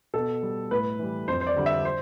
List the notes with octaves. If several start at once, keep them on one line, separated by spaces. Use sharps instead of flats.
B2 A4
G3
A2 B4
E3 G3
F2 C5
C5
D5
D3 G3
E5
C5